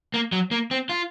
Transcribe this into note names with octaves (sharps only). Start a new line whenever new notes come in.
A#3
F#3
A#3
C4
F4